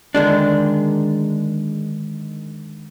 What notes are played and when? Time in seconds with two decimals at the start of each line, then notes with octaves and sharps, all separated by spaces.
0.15 D3 D#3 G#3 D4